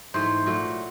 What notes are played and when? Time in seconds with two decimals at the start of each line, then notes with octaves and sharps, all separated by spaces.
0.14 G#2 E3 A3 C5
0.46 A#2 F#3 A3